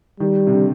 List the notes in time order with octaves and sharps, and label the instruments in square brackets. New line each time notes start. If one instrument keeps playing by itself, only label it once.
[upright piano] D#3 [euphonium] G3
[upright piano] C3
D3